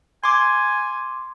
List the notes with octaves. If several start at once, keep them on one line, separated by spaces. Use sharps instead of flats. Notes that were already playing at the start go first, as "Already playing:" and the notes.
G#5 C6 D6